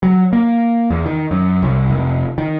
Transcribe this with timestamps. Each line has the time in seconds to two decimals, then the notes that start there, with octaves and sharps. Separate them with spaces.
0.03 F#3
0.33 A#3
0.90 E2
1.06 D#3
1.31 F#2
1.63 C2
1.90 F1
2.38 D#3